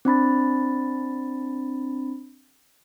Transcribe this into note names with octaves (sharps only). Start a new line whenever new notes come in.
C4 D4 B5 A6